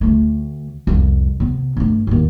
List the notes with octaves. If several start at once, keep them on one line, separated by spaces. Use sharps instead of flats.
D2 A3
C2 F2
C3 B3
G2 A3
A1 D#2